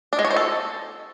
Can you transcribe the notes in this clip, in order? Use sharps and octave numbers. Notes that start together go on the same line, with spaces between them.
D4
G#3
C#5
C5
A4